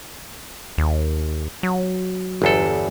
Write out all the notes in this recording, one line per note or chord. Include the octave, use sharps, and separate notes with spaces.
D#2
F#3
G1 E2 A4